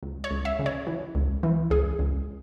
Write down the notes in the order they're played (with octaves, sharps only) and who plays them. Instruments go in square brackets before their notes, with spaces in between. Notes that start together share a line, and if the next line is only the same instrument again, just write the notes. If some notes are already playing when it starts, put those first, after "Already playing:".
[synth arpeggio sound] C#2
C#5
C#2
E5
C#3
C#5
E3
C#2
E3
C#2 G#4
C#2